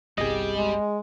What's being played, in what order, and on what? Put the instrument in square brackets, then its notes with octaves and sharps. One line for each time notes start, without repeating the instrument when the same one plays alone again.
[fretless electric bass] G1 C2 [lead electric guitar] G3 [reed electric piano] G#4 D#5
[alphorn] G#3